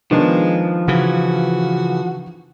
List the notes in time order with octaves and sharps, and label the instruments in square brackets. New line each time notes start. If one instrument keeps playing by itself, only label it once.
[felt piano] D#3 B3 D4 [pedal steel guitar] F3 [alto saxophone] G#3
[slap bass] C#3 E3 [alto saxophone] F#4